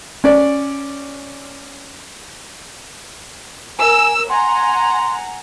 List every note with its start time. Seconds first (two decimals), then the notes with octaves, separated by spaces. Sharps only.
0.24 C#4 D5
3.79 A#4 G#5 E6
4.30 F#5 G#5 A#5 C6